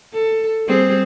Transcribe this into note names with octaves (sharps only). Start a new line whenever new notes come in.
A4
G3 C4 G#4